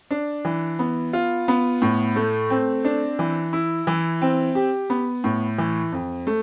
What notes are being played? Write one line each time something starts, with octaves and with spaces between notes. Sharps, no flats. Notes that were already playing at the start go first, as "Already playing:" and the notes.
D4
E3
B3
F4
B3
A2
A3
C4
D4
E3
E4
E3
C4
G4
B3
A2
E3
F2
A3